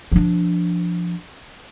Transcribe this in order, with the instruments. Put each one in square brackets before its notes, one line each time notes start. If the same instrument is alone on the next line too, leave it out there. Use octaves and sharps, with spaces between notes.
[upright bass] F3 D4